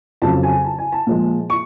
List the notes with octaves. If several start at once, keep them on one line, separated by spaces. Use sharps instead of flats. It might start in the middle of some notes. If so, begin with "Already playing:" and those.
F2 C#3 F#3 A5
G#5
A5
G#5
A5
A#2 F3 G#3
C#6